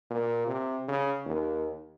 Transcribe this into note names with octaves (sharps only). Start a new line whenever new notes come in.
A#2
C3
C#3
D#2